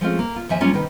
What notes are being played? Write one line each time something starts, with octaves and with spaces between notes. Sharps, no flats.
F3 G#3 A3 C4 C#4 F4
A#3
F4
D#2 F3 E5 G#5
F#3 G3 A#3 C#4 F4
C3 D#3 D#4 B4 G5